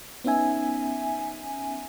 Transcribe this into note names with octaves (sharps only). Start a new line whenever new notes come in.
B3 C#4 D#4 E5 G#5